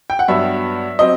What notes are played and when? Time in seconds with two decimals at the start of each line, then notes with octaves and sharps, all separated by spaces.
0.10 G5
0.19 F#5
0.28 G2 F#3 B3 E5
0.99 F#3 C4 D#5